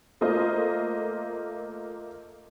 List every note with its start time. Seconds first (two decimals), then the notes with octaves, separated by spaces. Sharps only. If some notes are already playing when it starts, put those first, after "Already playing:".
0.21 A3 A#3 F4 C5 D#5